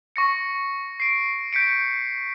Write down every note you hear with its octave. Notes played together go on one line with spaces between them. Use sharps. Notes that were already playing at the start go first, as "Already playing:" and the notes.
C#6 A#6 C#7
C7 D7
G6 B6 C#7 D7